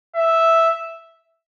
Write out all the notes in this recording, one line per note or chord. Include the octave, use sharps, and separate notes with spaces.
E5